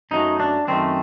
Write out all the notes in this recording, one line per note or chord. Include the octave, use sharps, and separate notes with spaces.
F#2 F#3 A3 D#4
D4
F#2 D#3 A3 C4